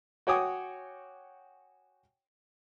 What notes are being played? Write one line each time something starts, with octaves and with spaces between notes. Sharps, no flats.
F#4 C#5 G5 G#5 D6 D#6